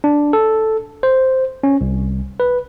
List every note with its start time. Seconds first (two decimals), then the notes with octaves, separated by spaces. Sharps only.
0.04 D4
0.33 A4
1.03 C5
1.63 C#4
1.81 C2
2.40 B4